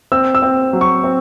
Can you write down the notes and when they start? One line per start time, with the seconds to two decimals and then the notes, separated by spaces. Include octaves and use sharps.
0.12 C4 E6
0.35 E6
0.42 C4
0.73 F#3
0.81 C#6
1.04 C4